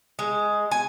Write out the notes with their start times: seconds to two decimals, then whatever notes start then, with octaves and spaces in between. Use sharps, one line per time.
0.19 G#3
0.71 G#5